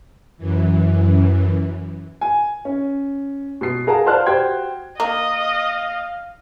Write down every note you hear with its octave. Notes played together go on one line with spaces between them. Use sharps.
F#2 E3
G#5
C#4
B2 C7
G#4 A#4 F5 F#5 A5 A#5
C5 D5 F5 A5 F6 F#6
F#4 G4 C5 G5 G#6
A#3 D#5 F5